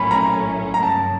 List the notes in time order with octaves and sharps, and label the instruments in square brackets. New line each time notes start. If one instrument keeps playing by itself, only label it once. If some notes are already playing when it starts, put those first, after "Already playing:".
Already playing: [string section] A#1 A2 F#3 A3 C#4 [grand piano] B5
[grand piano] A#5
A#5
[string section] G1 F#2 C#3 F#3 A#3 [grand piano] A5